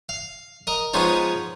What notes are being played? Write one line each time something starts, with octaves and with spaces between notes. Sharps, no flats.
F5
A#4 D#5
F3 G#3 B3 C#4 D#4